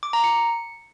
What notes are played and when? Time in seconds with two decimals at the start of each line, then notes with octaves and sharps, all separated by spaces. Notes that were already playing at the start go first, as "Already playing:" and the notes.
0.03 D6
0.13 A#5
0.24 C#7